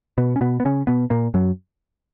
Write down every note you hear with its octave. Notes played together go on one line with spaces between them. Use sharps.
B2 B3
C#4
B2 B3
B3
C#3 C#4
B2 B3
A#2 A#3
F#2 F#3